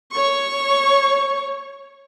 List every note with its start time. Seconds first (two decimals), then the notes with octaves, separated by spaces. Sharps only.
0.12 C#5 C#6